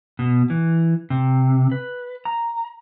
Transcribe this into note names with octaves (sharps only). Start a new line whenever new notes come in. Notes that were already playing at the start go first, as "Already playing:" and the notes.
B2
E3
C3
B4
A#5